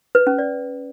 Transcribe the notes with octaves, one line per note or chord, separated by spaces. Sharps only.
B4
C#4
D5